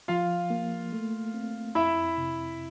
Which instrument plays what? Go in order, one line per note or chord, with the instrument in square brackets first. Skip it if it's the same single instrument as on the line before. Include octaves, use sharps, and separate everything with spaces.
[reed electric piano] F3 [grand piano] F4 F5
[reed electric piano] A#3
A3
C4
[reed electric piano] F2 [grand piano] E4 E5
[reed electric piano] C3